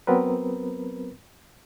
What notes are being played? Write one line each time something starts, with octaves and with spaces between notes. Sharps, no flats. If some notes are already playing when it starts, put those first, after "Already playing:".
F#3 B3 C4 A#4 B4